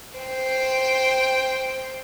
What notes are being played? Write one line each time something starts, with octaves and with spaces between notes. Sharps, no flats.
C5 G5